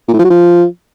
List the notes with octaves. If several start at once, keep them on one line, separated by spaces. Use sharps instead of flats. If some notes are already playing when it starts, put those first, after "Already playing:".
A#2
A2
F3
F#3
F3